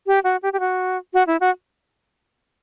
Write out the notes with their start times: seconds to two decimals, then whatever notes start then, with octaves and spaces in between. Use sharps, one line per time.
0.07 G4
0.24 F#4
0.43 G4
0.53 G4
0.60 F#4
1.14 F#4
1.27 E4
1.41 F#4